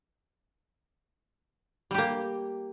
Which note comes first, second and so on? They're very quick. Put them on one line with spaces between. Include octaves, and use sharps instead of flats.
G3 G4 A#3